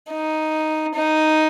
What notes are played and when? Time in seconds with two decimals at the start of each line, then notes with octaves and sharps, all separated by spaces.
0.11 D#4
0.95 D#4